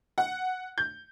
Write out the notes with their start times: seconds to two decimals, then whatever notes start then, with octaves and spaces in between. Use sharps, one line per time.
0.18 F#5
0.78 G6